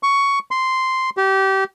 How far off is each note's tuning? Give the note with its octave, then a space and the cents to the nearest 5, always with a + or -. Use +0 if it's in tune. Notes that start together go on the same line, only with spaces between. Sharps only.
C#6 +10
C6 -5
G4 -25